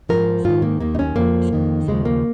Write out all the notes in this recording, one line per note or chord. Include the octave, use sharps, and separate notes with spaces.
G#2 F3 A#4
G#2 D#3 F4
A#3
D#2 D#3 A#3
D#4
C#4
F2 F3 A#3
F2 D#3
D#2 C#3 F3 G#3
A#3